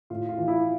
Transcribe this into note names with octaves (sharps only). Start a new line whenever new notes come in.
A2 F4
F4
E3
E4